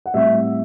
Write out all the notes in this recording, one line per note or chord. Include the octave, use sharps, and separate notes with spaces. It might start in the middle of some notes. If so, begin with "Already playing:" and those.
F#5
A2 G3 C4 E5